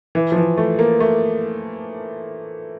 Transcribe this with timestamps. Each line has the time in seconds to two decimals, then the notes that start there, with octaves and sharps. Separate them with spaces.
0.15 E3
0.32 F3
0.36 E3
0.57 A3
0.79 A#3
1.00 A3